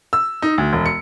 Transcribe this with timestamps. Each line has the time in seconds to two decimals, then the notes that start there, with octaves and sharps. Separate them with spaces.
0.13 E6
0.42 D#4
0.58 D2
0.73 E1
0.86 C#7